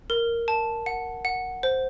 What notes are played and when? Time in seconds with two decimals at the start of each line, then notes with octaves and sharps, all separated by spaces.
0.10 A#4
0.48 A5
0.86 F#5
1.25 F#5
1.63 C5